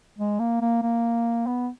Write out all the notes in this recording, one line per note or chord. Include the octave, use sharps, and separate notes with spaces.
G#3
A#3
A#3
A#3
B3